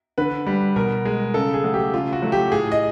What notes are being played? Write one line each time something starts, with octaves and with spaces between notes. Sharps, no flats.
D3 B4
G3
B2 A#4
G#3
C#3 A4
G#4
F#3 A3
G4
C#3 F4
F#4
F#3 A3
G4
A2 G#4
D#5